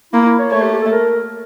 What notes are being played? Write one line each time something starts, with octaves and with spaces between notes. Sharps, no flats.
A#3 E4
E4
C#5
A3 C#5
G4
G4
A4
A#4